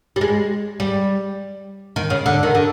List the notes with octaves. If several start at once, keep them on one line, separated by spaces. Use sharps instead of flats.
G3
G#3
G3
D#3
C#3
D3
D#3
D3